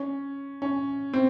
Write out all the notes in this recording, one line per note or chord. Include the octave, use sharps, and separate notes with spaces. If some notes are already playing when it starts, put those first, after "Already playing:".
Already playing: C#4
C#4
C4